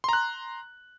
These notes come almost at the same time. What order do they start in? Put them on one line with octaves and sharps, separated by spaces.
C6 A#5 F#6